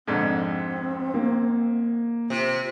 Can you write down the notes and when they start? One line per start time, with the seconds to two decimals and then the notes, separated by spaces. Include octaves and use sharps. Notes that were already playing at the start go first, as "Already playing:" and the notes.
0.07 F2 G#2 D3 C4
1.14 A#3
2.30 C3 F4